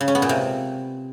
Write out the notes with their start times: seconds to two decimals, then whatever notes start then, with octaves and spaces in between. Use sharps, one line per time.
0.01 C#3
0.08 C#4
0.15 B3
0.22 A#2
0.29 C3